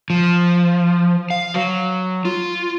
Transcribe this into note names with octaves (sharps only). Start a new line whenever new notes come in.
F3
F5
F#3
F4